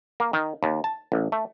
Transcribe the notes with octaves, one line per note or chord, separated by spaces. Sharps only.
A#3
D#3
D#2
A5
A1
A3